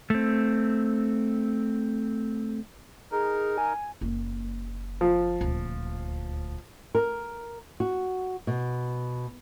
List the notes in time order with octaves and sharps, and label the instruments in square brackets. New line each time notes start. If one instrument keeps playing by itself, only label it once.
[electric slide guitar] A3 C4
[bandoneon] D#4 A#4 [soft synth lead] G#4
[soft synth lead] G#5
[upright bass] F#1 A#3
[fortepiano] F3
[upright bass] D#1 D2
[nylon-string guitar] A#4
F#4
B2